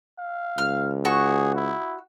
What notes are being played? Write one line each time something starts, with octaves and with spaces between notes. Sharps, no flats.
F5
C#2 F6
F#4 G#4 C#6
E4